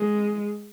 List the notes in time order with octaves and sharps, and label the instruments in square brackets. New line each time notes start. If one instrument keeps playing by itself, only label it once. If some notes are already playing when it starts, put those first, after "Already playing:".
Already playing: [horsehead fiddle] G#3